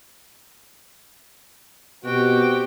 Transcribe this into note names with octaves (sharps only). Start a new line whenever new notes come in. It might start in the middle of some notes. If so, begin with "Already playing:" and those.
B2 C4 F#4 G4 G5